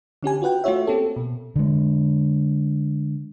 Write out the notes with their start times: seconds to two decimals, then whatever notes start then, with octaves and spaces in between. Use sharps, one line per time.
0.23 D3 C#4 G4 G#5
0.42 F4 F#4 B4 F#5 G5
0.64 A3 F4 F#4 C#5 E5
0.87 A#3 C4 C#4 G4 A4
1.16 B2
1.56 D3 G#3